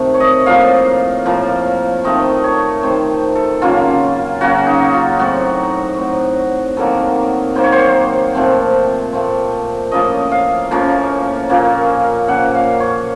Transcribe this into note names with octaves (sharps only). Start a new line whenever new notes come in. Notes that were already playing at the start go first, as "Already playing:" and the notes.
Already playing: C3 D#3 A3 C4
C#5
D#5
A2 F3 A#3 F5
A2 F3 A#3
D#3 A3 C4 D#5
C#5
D#3 A3 C4 C5
A4
C#3 F#3 A#3 C#4 F4
C#3 F#3 A#3 C#4 F#4
D#4
F4
A2 F#3 C4 F#4
A2 F#3 C4
D#3 F#3 A#3 A4
D#3 F#3 A#3 C5
C#5
C5
A#2 F3 A3 C4
A#2 F3 A3 C4
A2 F3 A#3 C#4 D#5
F5
A2 F3 A#3 C#4
A#2 F3 A#3 C#4
A#2 F3 A#3 C#4 F#5
F5
C#5